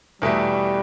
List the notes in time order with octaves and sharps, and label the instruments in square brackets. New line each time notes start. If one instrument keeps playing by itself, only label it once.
[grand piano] E2 B2 A3 E4 [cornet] G3